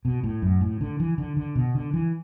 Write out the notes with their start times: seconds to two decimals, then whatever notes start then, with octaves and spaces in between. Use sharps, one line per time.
0.05 B2
0.24 A2
0.42 F#2
0.61 A2
0.81 D3
1.00 E3
1.18 D3
1.37 D3
1.55 B2
1.75 D3
1.94 E3